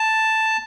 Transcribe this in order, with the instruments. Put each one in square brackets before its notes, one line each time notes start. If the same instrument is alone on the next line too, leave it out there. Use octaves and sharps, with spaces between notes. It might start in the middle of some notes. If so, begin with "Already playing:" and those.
Already playing: [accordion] A5